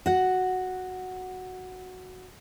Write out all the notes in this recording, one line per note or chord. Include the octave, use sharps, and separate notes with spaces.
F#4 F#5